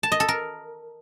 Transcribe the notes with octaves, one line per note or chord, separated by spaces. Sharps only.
A5
D#5
A4
A#4